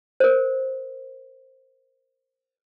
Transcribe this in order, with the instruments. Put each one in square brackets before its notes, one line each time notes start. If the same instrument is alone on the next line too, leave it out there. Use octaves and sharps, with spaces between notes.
[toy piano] A#4 C5